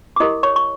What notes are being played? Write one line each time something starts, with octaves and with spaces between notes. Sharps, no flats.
D6
E4 G4 A#4 D#5 D#6
C#5 C#6
C#6